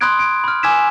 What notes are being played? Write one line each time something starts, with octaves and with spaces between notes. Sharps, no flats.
B5 C6 D#6 F#6 G#6 D7
D7
B5 F6
G#5 D6 E6 G#6 B6 E7